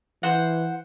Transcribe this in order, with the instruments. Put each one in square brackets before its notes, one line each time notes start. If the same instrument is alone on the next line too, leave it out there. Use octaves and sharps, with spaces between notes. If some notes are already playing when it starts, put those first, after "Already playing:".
[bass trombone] E3 [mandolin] C5 F#5